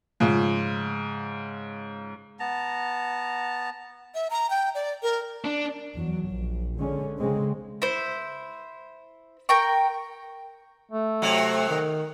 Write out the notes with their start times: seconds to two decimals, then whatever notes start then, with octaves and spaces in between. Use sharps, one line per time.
0.20 G#2 C#3 F3
2.40 B3 A5 A#5
4.15 E5
4.30 A#5
4.50 G5
4.75 D5
5.03 A#4
5.44 D4
5.95 E2 F#3
6.28 A#1
6.76 D3 G#3 C#4
7.18 C#3 G#3 C4
7.82 E4 C5
9.49 A#4 G5 C#6
10.91 A3
11.22 C3 F#3
11.69 D#3